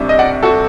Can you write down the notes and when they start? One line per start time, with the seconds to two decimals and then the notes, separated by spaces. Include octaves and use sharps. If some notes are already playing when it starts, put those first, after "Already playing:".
Already playing: C2 C3 G3 D4
0.09 D#5
0.19 D5 F#5
0.43 F#4 A4